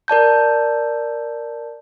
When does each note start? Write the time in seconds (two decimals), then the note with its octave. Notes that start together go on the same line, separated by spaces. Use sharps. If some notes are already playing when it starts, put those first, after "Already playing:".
0.08 A#4 D5 A5 G6